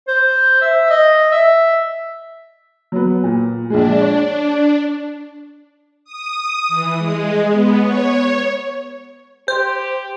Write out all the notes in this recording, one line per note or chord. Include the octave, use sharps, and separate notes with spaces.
C5
E5
D#5
E5
F#3 B3
A#2
A#1 G#3 D4
C#5
D#6
E3
G#3
B3
C#5
G4 C5